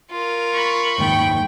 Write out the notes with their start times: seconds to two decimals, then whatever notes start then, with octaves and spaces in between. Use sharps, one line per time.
0.11 F4 A#4
0.53 B5 C#6
0.98 F#1 D#2 G#2 G5